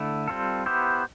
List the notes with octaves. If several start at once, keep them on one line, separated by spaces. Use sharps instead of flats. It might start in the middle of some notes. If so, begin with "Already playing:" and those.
Already playing: D3 A3 E4
G3 C4 F4 A4
B3 E4 G4 C5